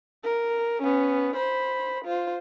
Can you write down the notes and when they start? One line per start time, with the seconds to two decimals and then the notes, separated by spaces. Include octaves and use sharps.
0.24 A#4
0.82 B3 C#4
1.36 C5 B5
2.05 F4 C5